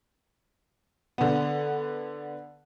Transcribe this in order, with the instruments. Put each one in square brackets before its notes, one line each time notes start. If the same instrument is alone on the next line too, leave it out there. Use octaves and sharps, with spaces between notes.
[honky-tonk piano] D3 B3